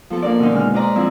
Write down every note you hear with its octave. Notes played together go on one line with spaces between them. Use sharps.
F3 B3 A4
F3 A#3 D4 A#4 D5
B2 D3 D#3 C#4 D#4
G#3 D4 F6
B4 C5 D5 D#5 A#5 C6
D3 F3 C4 E4